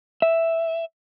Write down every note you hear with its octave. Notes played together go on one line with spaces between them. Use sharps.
E5